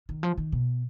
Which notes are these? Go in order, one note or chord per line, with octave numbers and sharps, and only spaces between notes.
D#3
F3
D#3
B2